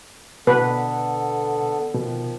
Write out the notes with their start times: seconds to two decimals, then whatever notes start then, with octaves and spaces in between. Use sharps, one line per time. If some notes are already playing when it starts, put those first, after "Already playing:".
0.47 B2 D3 B3 A4 B4
1.95 B2 D#3 F3